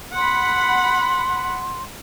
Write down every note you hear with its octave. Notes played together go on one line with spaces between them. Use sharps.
F#5 B5 C6